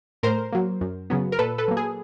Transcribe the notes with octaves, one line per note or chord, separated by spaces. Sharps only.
A2 A#4 C5
F#3 A#3
F#2
C#3 F#3 B3
A#4
A#2 A4 B4
A4 B4
F#3 A#3
G#4